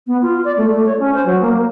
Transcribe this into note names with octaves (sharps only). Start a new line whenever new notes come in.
B3
F4
D5
A3
A3
C#5
C#4
C5
F#3
A#3
A#3